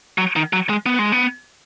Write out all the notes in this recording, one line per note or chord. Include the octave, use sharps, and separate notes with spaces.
F#3
D#3
F#3
G#3
B3
G#3
B3